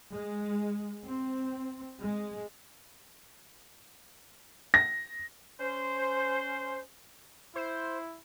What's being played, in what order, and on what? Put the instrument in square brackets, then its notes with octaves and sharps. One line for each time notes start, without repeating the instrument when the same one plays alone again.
[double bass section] G#3
C4
G#3
[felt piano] A#6
[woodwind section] C#4 C5
[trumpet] E4 [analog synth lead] C5